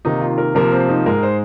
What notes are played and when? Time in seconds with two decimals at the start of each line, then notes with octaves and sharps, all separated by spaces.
0.05 C3 D#3 A#3 D#4
0.21 F4
0.38 A#4
0.55 C3 F3 A#3 A#4
0.72 C4
0.89 D#4
1.06 G#2 G#3 A#4
1.23 C5